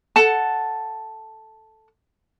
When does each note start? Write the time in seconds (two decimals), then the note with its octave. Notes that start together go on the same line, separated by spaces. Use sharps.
0.16 A4 F#5 A5